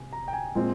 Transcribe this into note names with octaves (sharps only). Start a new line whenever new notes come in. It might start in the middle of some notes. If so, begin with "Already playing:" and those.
Already playing: C3 G#5
A#5
G5
G#5
A#2 G#3 C4